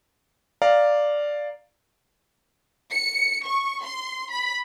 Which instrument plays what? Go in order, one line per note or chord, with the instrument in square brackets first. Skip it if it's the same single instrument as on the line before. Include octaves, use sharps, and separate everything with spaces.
[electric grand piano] D5 F5 A#5
[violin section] C#7
C#6
C6
B5